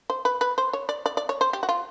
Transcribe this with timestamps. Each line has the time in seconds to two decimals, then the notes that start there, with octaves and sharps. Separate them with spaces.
0.10 C5
0.25 B4
0.41 B4
0.58 C5
0.73 C#5
0.89 D5
1.06 D5
1.17 D5
1.29 C#5
1.41 C5
1.53 G4
1.63 F#4
1.69 F4